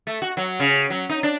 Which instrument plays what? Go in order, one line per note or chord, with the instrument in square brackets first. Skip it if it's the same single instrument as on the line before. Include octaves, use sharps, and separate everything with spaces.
[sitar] A3
F#4
F#3
C#3
F#3
D#4
D4